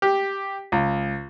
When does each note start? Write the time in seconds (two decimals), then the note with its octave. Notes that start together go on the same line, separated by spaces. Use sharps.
0.02 G4
0.72 C#2